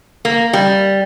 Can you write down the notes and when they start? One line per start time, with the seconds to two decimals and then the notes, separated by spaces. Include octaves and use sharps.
0.25 A#3
0.53 G3